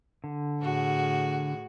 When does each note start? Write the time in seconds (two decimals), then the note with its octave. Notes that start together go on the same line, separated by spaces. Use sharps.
0.24 D3
0.62 A2 F#4 G#4